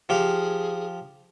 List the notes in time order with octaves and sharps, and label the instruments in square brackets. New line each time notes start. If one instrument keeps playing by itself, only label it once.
[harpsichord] F3 G4 F5 [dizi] G#4